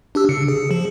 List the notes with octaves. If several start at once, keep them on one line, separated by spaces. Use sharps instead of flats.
D4 G4 E6
C#3 C#7
G#4
F3